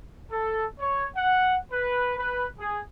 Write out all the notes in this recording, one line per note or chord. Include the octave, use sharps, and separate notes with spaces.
A4
C#5
F#5
B4
B4
G#4